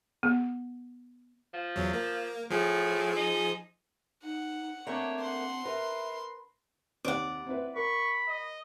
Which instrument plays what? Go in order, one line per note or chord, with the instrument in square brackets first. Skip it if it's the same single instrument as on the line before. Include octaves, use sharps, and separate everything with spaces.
[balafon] B3
[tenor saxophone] F3
[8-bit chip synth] E2 F#3
A#3
[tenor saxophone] A2 [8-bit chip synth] F3 G#4
[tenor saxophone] D#4
[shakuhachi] D#4 [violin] F#5
[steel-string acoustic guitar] A3 A#3 [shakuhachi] C4 [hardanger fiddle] D4 C#5
[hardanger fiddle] F#5 [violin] C6
[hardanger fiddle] A#4 [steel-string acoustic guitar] B4 [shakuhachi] E5
[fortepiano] D#2 C3 [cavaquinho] D5 F#5
[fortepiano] C4 E4 B4
[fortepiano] A#4 [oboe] B5 [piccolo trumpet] C#6
[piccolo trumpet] D#5